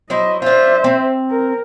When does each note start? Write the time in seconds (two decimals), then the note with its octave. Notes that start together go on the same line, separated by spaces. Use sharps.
0.10 F#3 E4 C5 D#5
0.42 D4 F4 C5 E5
0.84 C4
1.30 A#4